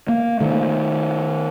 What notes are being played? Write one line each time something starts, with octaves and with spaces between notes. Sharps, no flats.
A#3
D#3 A3